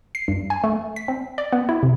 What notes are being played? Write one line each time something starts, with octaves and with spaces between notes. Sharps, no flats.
C7
G2
G#5
A3
B6
C4
D5
B3
E4
C3